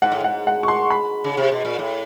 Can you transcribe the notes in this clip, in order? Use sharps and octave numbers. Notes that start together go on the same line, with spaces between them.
G#2 F#5
A2
G#2 F#5
F#5
C#6
C6
B5
C#3
C3
B2
A#2
A2